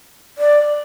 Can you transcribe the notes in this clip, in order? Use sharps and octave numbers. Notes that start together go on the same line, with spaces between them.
D5